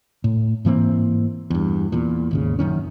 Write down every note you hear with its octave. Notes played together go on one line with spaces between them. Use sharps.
A2
G#2 E3 A#3 C4
E2 G2
E2 A#2
G#1 D#2 C#3
A#1 F#2 D#3 C#4